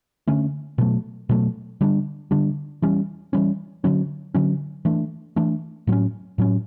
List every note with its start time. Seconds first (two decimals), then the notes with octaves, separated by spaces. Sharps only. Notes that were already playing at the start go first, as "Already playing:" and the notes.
0.27 D3 A3 C#4
0.78 B2 F#3 A3
1.29 B2 F#3 A3
1.81 D3 G3 D4
2.31 D3 G3 D4
2.82 E3 G3 C#4
3.33 E3 G3 C#4
3.84 D3 F#3 C#4
4.34 D3 F#3 C#4
4.85 E3 A3 D4
5.36 E3 A3 D4
5.87 A2 F#3 C#4
6.38 A2 F#3 C#4